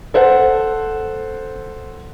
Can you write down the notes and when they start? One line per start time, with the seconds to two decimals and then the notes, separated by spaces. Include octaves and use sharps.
0.14 A4 C5 F#5